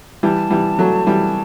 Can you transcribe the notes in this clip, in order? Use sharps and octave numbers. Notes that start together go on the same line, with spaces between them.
E3 G3 A5
E3 G3
F#3 A3
E3 G3